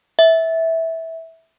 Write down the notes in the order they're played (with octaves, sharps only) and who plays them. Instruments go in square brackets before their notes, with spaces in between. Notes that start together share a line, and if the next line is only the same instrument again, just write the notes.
[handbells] E5